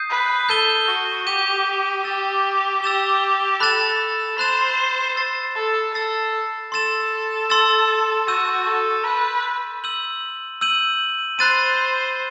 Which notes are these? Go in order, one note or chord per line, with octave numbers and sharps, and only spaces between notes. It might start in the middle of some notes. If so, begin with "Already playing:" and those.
Already playing: D#6 G6 C7 D#7
B4
A4 G6 D#7 G7
F#4
G4 G6 D#7 G7
G4 E6 A6 E7 G7
G4 E6 A6 E7 G7
A4 B5 F#6 A6 E7
C5 B5 F#6 A6 E7
E6 A6 C7 E7
A4
A4 E6 A6 C7 E7
A4 C6 E6 A6 E7
C6 E6 A6 E7
F#4 E6 G6 D#7
A4
B4 E6 G6 D#7
E6 G6 D#7 F#7
E6 G6 D#7 F#7
C5 B5 F#6 A6 D#7